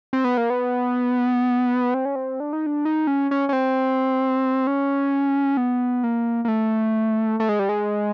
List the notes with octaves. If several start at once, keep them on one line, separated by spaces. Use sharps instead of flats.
C4
B3
A#3
B3
C4
C#4
C4
D4
D#4
D4
D#4
C#4
C#4
C#4
C4
C#4
B3
A#3
A#3
A3
A3
G#3
G3
G#3